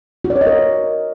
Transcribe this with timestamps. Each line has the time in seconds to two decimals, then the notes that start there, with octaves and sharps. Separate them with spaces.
0.25 F#4
0.30 D5
0.36 C#5
0.41 D#5
0.47 A#4